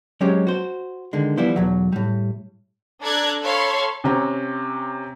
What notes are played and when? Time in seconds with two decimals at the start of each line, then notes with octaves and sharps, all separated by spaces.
0.21 F#3 G#3 C4 C#4 G4
0.47 F#4 C5
1.13 D3 D#3 G#3
1.37 E3 F3 G3 B3 E4 C5
1.56 B1 E2 F#3
1.92 A2 G3
3.03 D4 A4 D5 A#5 F#6 G#6
3.43 A4 C#5 F5 B5 C6
4.04 C3 C4 C#4 A#5